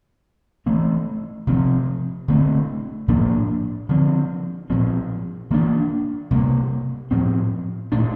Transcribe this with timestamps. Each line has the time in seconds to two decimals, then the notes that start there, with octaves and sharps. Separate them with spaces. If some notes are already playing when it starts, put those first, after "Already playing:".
0.66 E3 A3 C4
1.47 C3 F3 C4
2.28 D3 A3 C4
3.08 A2 F3 A#3 D4
3.89 D3 F3 C4
4.70 A#2 F3 C4
5.50 E3 A#3 D4
6.31 C3 G3 A#3
7.11 A2 F3 C4
7.92 A#2 A3 D4